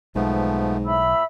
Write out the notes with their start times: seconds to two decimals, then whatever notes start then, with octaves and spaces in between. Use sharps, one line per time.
0.16 B1 G#2 F3 A3 B3
0.85 A2 E5 B5 E6